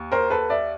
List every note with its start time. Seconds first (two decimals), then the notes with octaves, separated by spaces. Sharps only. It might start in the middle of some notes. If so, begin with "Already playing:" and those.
Already playing: D#2
0.12 A#4 C5
0.30 A4 B4
0.50 D5 E5